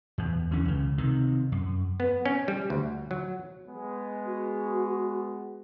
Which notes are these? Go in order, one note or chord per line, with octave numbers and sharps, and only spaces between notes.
E2
E3 C#4
C#2 C#3
C3 D#3
F#2
B3
C#4
G3
D2
F#3
G#3 B3
F#4